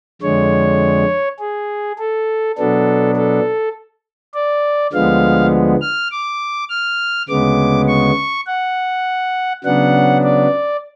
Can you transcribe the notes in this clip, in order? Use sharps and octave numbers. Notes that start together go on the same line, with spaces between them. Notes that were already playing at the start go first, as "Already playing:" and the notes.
F2 D3 G#3 C#5
G#4
A4
B2 F#3 B3 D4 A4
A4
D5
D2 D3 F3 G#3 B3 F5
F6
D6
F6
D2 C#3 G#3 B3 D6
C#6
F#5
C#3 F#3 B3 D4 F#5
D5